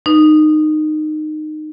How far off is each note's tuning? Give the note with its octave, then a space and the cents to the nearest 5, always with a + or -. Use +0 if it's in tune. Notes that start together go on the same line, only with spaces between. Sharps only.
D#4 -20 B4 +0